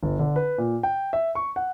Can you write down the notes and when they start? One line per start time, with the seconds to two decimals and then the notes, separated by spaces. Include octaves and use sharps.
0.03 G1
0.19 D3
0.36 B4
0.58 A#2
0.83 G5
1.13 E5
1.35 C#6
1.56 F#5